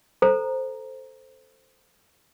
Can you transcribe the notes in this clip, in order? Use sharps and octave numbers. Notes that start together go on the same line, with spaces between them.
A4 C5 A#5